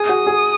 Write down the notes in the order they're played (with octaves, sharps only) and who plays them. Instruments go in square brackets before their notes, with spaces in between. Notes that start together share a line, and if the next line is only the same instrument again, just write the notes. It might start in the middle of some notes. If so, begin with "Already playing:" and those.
Already playing: [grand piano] G#4 [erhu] D#6
[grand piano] F#4
G#4